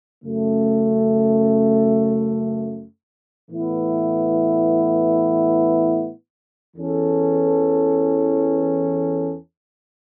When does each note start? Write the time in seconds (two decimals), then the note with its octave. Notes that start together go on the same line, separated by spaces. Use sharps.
0.24 F#2 C#3 A3
3.50 A2 E3 B3 E4
6.76 E2 E3 C#4 A4